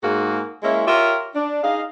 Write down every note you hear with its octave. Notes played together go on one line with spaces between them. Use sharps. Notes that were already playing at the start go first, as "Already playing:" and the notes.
G#2 A#3 F#4 G#4
G#3 A#3 C#4 E4
F4 G4 A#4 C#5 E5
D4
D#4 G#4 D#5 F5